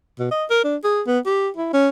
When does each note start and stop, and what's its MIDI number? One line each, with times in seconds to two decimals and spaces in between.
0.19 0.29 47
0.31 0.45 75
0.50 0.63 70
0.64 0.77 62
0.84 1.02 68
1.07 1.19 59
1.26 1.49 67
1.57 1.71 64
1.73 1.89 61